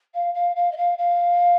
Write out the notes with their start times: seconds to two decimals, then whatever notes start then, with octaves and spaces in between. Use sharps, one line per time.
0.14 F5
0.34 F5
0.56 F5
0.71 D#5
0.77 F5
0.98 F5